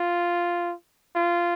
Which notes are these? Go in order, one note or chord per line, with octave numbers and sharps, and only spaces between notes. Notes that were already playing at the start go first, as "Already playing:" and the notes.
Already playing: F4
F4